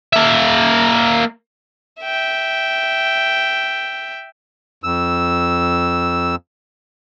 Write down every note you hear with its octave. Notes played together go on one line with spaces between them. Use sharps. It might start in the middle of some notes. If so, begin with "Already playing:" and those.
A#3 E5
E5 G5
F2 E6